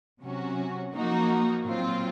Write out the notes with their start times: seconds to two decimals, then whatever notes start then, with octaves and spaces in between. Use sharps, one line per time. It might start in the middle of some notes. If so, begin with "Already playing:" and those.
0.22 C3 F#3 C#4 F#4
0.93 F3 A#3 D#4 F#4
1.65 A#2 F#3 C4 F4